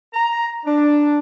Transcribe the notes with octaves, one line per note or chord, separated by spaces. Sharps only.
A#5
D4